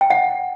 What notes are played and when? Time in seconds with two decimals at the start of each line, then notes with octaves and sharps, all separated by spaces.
0.01 G5
0.10 F#5